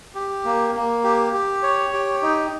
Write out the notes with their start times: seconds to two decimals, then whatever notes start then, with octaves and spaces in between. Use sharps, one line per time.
0.15 G4
0.45 A#3
0.75 A#3
1.04 G4
1.33 G4
1.63 C#5
1.93 G4
2.22 D#4